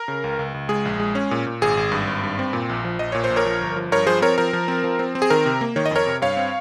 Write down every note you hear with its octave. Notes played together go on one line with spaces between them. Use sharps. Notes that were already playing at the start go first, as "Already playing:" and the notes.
Already playing: A#4
C#3
C#2
C#2
C#2
G#3 G#4
A#1
G#3
C#4
A#2
A#2
G#1 G#4
G#1
G2
G#1
G2
C4
A#2
A#1
F3
A#1 D#5
A#2 C#5
C5
A#1
A#4 C#5
F3
G1
F3
G2 A#4 C#5
F3 G#4 C5
C4 A#4 C#5
F3 A#4
F3
C4
F3
C4
C4
G#4
D#3 A#4
C3
A#3
D#3 C#5
D#5
F2 A#4 C#5
C3
G2 C#5 F5
C4